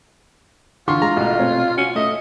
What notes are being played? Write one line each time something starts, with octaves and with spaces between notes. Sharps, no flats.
D3 E3 D4 F4 C6 C#6
G#3 G#4 A#5
A1 B2
B2 A3 C4 C#5
C#4 F#4
A3 D#5 E5